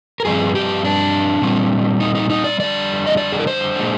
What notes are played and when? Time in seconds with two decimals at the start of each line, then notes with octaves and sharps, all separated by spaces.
0.20 A#4
0.25 G2 F3 C4 G#4
0.55 G4
0.84 D4
1.42 A#2 G3 C4
2.00 D#4
2.15 D#4
2.30 D#4
2.44 D5
2.59 F2 D3 G3 D5
3.06 D#5
3.17 D5
3.32 G#4
3.40 A#4
3.47 C5
3.76 A#2 G#3 D4